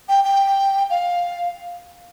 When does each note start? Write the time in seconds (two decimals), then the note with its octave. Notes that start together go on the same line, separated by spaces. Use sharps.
0.09 G5
0.25 G5
0.90 F5